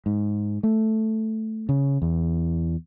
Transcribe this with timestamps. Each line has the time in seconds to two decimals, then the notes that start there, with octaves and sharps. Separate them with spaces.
0.06 G#2
0.63 A3
1.69 C#3
2.02 E2